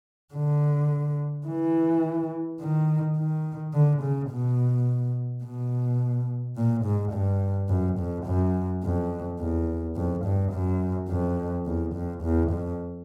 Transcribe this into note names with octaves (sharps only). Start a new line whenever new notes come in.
D3
E3
D#3
D#3
D3
C#3
B2
B2
A#2
G#2
G2
F#2
F2
F#2
F2
E2
F2
G2
F#2
F2
E2
F2
E2
F2